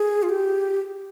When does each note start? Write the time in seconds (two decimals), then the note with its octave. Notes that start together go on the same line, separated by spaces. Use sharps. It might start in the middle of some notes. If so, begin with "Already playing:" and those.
Already playing: G#4
0.23 F4
0.29 G4